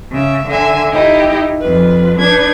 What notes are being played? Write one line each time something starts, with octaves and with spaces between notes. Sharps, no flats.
C#3 E5
D3 E5 G#5
D#4 E4 G4 D#5
F2 F4 B4
D4 D#4 B4 G#6